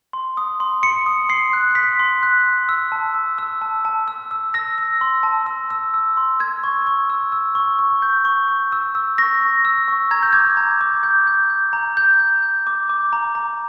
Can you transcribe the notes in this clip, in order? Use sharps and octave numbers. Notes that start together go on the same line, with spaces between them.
C6
D#6
C6
C6 C#7
D#6
C6 C7
F#6
C6 B6
C6
F#6
C6
E6
A5
E6
E6
A5
A5
E6
E6
E6 A#6
E6
C6
A5
E6
E6
E6
C6
E6 G#6
C#6
C#6
E6
E6
C#6
C#6
G6
C#6
C#6
E6
E6
C#6 A#6
C#6
E6
C#6
A#5 G#6
G6
D6 G#6
A#5
D6
G6
G6
G6
A#5
G6
G6
G6
D6
D6
A#5
A#5